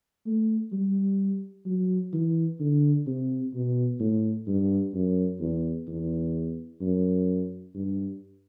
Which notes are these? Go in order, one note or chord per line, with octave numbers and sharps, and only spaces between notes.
A3
G3
F#3
E3
D3
C3
B2
A2
G2
F#2
E2
E2
F#2
G2